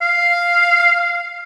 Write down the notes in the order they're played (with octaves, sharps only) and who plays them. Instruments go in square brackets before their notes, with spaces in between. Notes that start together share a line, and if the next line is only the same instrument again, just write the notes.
[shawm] F5